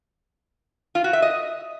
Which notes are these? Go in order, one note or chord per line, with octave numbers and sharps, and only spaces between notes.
F4
F#4
E5
D#5